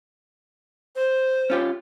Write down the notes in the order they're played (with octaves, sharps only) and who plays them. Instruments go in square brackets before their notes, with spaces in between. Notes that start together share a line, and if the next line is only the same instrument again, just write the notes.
[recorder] C5
[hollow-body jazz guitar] C#4 F4 G4